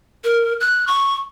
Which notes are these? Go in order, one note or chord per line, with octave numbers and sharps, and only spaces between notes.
A#4
F#6
C#6